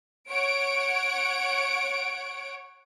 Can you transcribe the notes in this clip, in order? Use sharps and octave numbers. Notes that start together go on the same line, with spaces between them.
C#5 F#5 D7